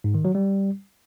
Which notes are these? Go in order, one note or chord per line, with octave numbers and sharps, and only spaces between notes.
G#2
D#3
F#3
G3